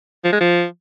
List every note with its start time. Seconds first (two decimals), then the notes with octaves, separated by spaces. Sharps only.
0.24 F3
0.33 G#3
0.41 F3